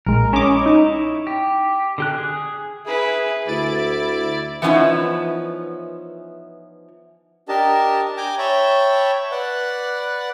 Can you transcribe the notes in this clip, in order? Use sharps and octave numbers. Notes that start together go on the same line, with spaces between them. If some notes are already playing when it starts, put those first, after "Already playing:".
A#1 G#3 A#4
C#4 E4 C#5 D#5 D6
D#4
G4
D3 G4 F#6
G#4
E4 G#4 B4
D2 E4 D5 A6 D7
E3 F3 B3 C#4 D#4 E4
D4 G4 A#4 D#5 A5
G5 G#5 A#5 D6
C#5 E5 G5 A5 B5
B4 D5 F#5